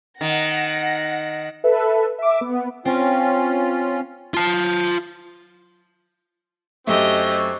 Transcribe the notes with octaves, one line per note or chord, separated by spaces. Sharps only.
D#3 F#5 A#6
A4 B4 E5
E5 D6
B3
C4 C#4 F4
F4 A5
F#2 A3 C4 D4 G4 C#5 D#5